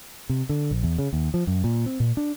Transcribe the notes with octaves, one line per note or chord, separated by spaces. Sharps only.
C3
D3
A#1
E2
C#3
D#2
F3
F#2
A#2
C4
A#2
D4